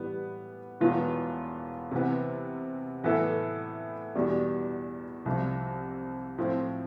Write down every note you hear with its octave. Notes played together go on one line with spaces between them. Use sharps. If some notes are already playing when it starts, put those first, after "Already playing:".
Already playing: A2 E3 G3 B3
E1 E2 B2 B3 F4
C3 E3 B3
A2 E3 B3 E4 A4
E2 B2 G3 D4
C2 C3 F3
A2 F3 C4